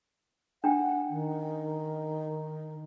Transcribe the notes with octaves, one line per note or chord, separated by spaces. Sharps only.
D4 F#5 G5
D#3